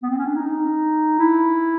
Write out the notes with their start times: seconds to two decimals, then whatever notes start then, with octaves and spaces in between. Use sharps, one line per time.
0.03 B3
0.10 C4
0.18 C#4
0.27 D4
0.35 D#4
1.19 E4